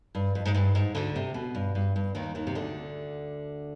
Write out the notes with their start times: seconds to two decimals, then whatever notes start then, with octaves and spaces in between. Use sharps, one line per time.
0.15 G2
0.35 F2
0.45 G#2
0.54 G2
0.75 G#2
0.95 D2 D3
1.16 C3
1.34 B2
1.55 G2
1.75 G2
1.96 G2
2.15 D#2 D#3
2.35 D#2 D#3
2.47 C3
2.55 D2 D3